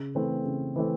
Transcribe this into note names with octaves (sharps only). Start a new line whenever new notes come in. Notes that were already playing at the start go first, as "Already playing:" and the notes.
Already playing: C#3
E3 A3 C4
C#3
E3 A3 C4